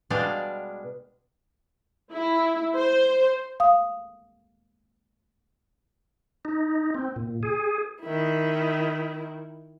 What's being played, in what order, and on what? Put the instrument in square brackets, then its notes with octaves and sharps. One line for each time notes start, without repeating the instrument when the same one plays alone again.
[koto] B2 G3 G#3 D4 D5 F5
[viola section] E4
C5
[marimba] F5 D#6
[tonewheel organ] D#4
C4
A#2
G#4
[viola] D#3 E4